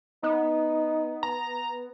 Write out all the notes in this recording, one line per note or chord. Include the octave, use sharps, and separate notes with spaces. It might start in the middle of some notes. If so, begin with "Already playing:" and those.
B3 D#4
A#5